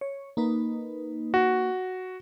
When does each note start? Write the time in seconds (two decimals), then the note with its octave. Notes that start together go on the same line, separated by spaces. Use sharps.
0.01 C#5
0.37 A#3 D#4 B4
1.34 F#4